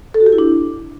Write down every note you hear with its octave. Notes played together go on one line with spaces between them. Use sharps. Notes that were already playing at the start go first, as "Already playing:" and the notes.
A4
F#4
G4
E4
D4